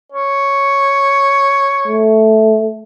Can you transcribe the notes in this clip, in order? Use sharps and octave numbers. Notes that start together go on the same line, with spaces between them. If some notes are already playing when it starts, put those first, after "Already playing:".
C#5
A3